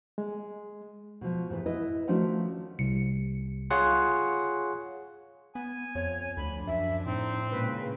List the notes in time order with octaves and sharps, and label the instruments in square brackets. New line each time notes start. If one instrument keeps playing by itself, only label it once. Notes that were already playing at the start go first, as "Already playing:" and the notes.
[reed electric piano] G#3
[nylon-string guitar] B2 F3
G#2 E3 B3
E4 B4 D#5
D#3 F3 A3 C#4 D4 F#4
[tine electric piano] C2 C#7
F4 G#4 C#5 F#5 C6
[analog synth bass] B3 [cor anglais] G#5
[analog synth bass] F2 [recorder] C#5
[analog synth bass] D2 [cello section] F3 D4 [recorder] B5
[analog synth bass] F#2 [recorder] E5
[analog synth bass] A2 [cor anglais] C4 [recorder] D#4
[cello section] A#2 C#3 G#3 [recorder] B4